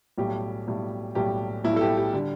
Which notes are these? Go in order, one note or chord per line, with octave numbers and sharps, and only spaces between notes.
B1 A2 G3 G4
B1 A2 G3
B1 A2 G3 G4
B1 A2 G3 E4
A4
G4
G4
D3 G3